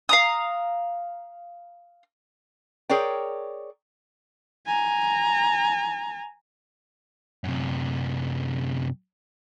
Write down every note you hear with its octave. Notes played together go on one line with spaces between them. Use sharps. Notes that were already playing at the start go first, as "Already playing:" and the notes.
F5 A#5 D#6
G#4 A#4 C#5 D5 G5
G#5 A#5
F#2 C3